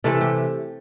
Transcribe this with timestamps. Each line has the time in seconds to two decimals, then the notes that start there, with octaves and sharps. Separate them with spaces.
0.04 C3 E3 A3 A4
0.21 G4